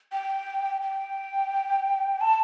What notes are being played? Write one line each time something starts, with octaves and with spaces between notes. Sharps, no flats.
G5
G5
A5